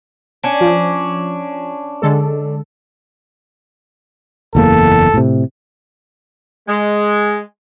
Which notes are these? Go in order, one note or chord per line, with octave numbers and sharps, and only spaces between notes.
C#4 D4
F3
D3 G#3 A4
F#1 E2 A#3 A4
A2 C3
G#3